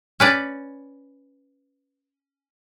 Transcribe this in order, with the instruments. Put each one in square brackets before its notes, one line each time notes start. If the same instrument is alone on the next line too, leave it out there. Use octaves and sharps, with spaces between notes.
[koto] C#4 B4 D5